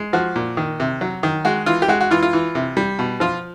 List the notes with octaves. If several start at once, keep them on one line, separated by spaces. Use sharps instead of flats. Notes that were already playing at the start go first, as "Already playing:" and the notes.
Already playing: G#3
F3 F#4
A#2
D#3
C3
F#3
D#3
G#3 F#4
E3 F4
G4
G#3 F#4
F#4
E3 F4
F4
E3
C3
G3
B2
F3 F4